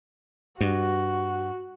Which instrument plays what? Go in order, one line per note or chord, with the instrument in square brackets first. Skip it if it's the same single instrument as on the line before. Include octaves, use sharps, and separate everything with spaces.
[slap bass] G2 [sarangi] F#4